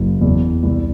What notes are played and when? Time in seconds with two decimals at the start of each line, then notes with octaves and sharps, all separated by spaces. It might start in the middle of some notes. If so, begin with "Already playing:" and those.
Already playing: F#1
0.21 E2
0.63 C2